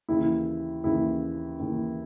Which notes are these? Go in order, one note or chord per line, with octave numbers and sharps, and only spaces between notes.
D#2 C#3 E3 E4
D#2 C#3 E3 E4
D#2 C#3 E3